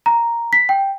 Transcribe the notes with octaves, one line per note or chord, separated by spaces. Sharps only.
A#5
B6
G5